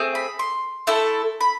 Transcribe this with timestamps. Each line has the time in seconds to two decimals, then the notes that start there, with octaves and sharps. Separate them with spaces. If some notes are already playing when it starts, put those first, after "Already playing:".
Already playing: A3 C4 G#4
0.15 B5
0.39 C6
0.87 A3 E4 A4
1.41 B5